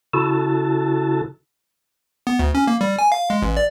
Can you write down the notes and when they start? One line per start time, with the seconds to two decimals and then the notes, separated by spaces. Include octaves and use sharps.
0.14 C#3 E4 F#4 A4 A5
2.27 B3
2.39 D2
2.55 C#4
2.67 A#3
2.81 G3
2.99 G#5
3.12 F5
3.30 G#3
3.42 A1
3.57 D5